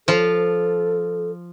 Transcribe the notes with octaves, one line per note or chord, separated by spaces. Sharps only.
F3 F4 A4